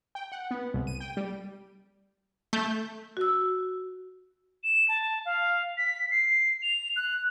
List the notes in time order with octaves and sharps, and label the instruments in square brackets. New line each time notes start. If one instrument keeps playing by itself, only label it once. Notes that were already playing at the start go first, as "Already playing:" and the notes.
[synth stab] G5
F#5
B3
C2
D#7
G5
G3
[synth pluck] A3 G6
[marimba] F#4 E6
[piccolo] E7
A5
F5
B6
C7
F7
F#6